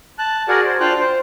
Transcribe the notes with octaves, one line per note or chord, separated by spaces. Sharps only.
A5 F#6
F#4 G#4 A#4 D5 F#5
C5
D4 F4 C5 F5 G5 F#6
C5